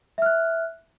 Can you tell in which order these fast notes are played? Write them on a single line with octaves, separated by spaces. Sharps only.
E5 F6 F#6